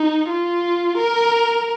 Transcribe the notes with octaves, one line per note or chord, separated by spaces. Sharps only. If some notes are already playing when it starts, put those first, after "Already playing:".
Already playing: D#4
F4
A#4